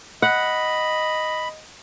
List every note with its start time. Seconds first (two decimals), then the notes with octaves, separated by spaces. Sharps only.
0.22 D#5 F#5 B5